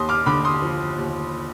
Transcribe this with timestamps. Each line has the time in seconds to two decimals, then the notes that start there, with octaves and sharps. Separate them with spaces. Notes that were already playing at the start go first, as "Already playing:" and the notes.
Already playing: D#2 C6 D#6
0.09 D6 F6
0.26 D3 B5 D6
0.45 C6 D#6
0.62 F3
0.98 D#2